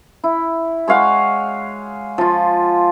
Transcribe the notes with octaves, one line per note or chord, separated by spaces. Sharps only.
E4
G#3 C#5 F5 F#5
F3 F4